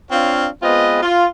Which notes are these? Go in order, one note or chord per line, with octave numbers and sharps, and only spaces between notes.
C4 D4 F4 C#5 F5
G#3 B3 C4 F4 B4 D#5
F4